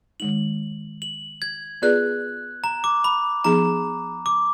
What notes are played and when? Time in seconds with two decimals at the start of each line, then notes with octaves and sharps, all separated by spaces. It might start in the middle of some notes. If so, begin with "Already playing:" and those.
0.20 D#3 G#3 D#4 F#7
1.02 F#7
1.42 G#6
1.82 B3 F4 G#4 B4 D5 F#6
2.64 A#5
2.84 D6
3.04 B5
3.44 F3 B3 D#4 G#4 A#5
4.26 D6